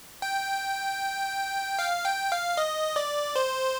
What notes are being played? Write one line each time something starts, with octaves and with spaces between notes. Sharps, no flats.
G5
F5
G5
F5
D#5
D5
C5